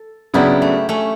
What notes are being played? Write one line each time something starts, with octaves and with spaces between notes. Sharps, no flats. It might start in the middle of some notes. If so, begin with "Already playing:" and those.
Already playing: A4
C#3 F#3 B3 D4 E4 G4
A3
A3 C#4